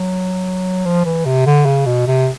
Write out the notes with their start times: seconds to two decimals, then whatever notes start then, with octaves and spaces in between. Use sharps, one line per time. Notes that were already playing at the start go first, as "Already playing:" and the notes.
Already playing: F#3
0.85 F3
1.05 E3
1.25 C3
1.46 D3
1.66 C#3
1.86 B2
2.07 C3